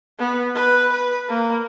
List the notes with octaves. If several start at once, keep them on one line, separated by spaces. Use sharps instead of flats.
B3
B4
B4
A#3